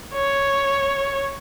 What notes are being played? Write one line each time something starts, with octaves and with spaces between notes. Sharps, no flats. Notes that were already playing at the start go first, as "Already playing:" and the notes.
C#5